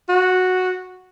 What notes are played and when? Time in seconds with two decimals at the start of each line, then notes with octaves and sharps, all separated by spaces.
0.09 F#4